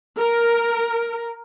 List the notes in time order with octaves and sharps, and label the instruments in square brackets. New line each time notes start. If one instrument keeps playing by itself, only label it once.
[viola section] A#4